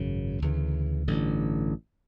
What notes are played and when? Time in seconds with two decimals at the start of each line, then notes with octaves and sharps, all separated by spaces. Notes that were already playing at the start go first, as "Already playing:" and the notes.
Already playing: G#1 F#2 C#3
0.42 D2 C#3 E3
1.08 A1 G2 D3